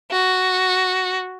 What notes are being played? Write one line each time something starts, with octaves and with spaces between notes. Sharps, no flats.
F#4